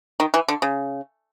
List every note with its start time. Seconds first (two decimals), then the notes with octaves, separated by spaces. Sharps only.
0.20 D#3
0.34 E3
0.48 D3
0.62 C#3